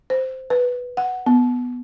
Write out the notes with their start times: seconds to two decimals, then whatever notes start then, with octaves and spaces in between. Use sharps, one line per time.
0.10 C5
0.50 B4
0.97 F#5
1.26 B3